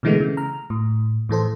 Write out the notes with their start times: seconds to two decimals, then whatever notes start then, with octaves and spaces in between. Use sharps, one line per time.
0.03 B2 D3 E3 G#3 A3 B3
0.20 C#3
0.37 A#5 F6
0.70 A2
1.29 A2 E3 A4 C5